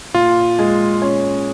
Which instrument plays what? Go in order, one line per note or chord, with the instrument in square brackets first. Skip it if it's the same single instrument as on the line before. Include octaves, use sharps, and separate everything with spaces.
[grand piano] A#2 [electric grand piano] F4
[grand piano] G#3
C#4